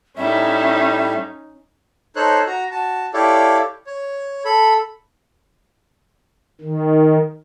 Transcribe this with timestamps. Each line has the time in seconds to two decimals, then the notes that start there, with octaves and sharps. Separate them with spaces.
0.17 A2 G3 C#4 D#4 E5
2.16 D#4 A4 C5 C#5 F#6
2.47 F#4 A#5
2.71 F#4 A5
3.14 E4 G4 A4 C#5 D5 F5
3.86 C#5
4.45 A4 B5
6.61 D#3